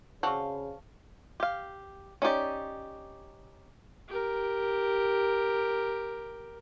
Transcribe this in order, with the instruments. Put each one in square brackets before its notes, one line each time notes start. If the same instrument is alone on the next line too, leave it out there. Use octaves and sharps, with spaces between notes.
[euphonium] C#3 [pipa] C4 D5 F5 [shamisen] F#4 [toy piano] A5 C#6
[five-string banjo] G4 F5
C#4 D#4 G4 D5
[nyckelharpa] G4 A#4